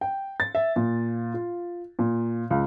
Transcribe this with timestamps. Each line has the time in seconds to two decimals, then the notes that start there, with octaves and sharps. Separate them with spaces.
0.01 G5
0.40 A6
0.55 E5
0.76 A#2
1.34 F4
1.99 A#2
2.50 C#2